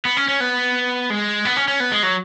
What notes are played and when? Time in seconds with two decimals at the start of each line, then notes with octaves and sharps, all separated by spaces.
0.05 B3
0.17 C#4
0.28 C#4
0.40 B3
1.10 G#3
1.45 B3
1.57 C#4
1.68 C#4
1.80 B3
1.92 G#3
2.03 F#3